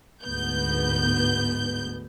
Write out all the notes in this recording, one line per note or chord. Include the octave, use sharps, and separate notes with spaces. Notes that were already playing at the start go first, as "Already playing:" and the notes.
D2 G#2 B3 G6